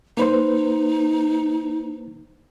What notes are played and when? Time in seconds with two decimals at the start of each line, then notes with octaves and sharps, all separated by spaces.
0.17 A#3 D#4 B4 C5